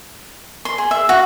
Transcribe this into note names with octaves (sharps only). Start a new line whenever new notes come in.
C6
G#4
E5
F#4